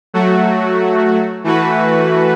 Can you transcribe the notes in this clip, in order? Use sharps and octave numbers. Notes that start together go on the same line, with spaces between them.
F#3 A3 F#4
E3 A3 F#4 B4